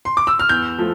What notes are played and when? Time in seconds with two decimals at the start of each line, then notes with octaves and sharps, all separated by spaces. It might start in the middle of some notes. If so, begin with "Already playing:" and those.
0.05 C6
0.17 D6
0.27 E6
0.39 F6
0.49 E2 G6
0.78 F3 A3